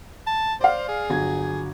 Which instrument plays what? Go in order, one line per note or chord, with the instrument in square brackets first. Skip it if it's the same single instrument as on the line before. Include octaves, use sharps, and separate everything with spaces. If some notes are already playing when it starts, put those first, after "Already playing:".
[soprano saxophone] A5
[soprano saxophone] C5 [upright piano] D5 F5
[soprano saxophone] G#4
[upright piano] G1 F#3 G#6